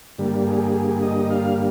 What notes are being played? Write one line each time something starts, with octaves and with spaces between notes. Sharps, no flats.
G2 D3 G3 A#3
G#4
G#4
D#5
F5